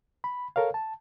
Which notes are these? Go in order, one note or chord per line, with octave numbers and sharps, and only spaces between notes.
B5
A4 A#4 C#5 F5
A5